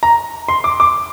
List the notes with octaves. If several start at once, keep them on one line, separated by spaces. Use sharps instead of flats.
A#5
C6
D6
D6